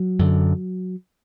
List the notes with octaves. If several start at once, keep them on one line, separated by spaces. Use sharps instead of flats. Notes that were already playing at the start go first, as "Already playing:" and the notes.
Already playing: F#3
F#2 D3